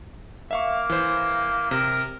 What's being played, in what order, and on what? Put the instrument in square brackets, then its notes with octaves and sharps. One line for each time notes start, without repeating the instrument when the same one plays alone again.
[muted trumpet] A#3 [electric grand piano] E5 F5 C#6
[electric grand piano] E3 C5
[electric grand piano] C3 [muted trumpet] A#4